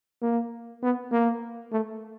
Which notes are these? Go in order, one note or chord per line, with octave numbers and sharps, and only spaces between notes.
A#3
B3
A#3
A3